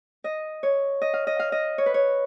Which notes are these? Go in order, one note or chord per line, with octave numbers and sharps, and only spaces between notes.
D#5
C#5
D#5
F5
D#5
F5
D#5
C#5
B4
C#5